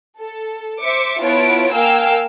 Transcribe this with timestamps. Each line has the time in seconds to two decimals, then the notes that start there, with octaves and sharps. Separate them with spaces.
0.19 A4
0.80 C5 E5 D6 C#7
1.22 B3 E4 F4 C#5 A5 D7
1.73 A#3 A#4 F5 G5 G#5 E6